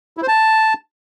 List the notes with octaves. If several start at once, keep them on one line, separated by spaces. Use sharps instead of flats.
E4
C5
A5